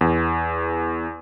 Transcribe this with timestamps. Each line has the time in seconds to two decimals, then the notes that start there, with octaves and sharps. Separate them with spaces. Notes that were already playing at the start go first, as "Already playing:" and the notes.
0.01 E2